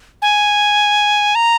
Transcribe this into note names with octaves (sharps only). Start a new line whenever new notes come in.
G#5
A#5